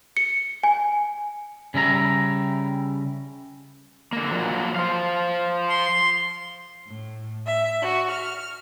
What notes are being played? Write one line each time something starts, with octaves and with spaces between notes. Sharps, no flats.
C#7
G#5
C#3 G3 E4 A#5
D3 A#3
F3 F#3 A#3
C5 F5
C6
A2
E5
F#4
F6